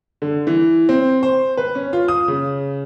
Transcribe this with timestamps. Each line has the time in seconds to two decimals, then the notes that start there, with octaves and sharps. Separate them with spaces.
0.22 D3
0.47 E3
0.89 C4
1.23 C5
1.57 B4
1.75 C#4
1.93 F4
2.08 D#6
2.28 C#3